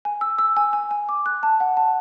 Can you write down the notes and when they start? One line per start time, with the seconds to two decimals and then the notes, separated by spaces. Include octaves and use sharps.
0.05 G#5
0.21 E6
0.39 E6
0.57 G#5
0.73 G#5
0.91 G#5
1.09 D6
1.26 F#6
1.43 A5
1.60 F#5
1.77 A5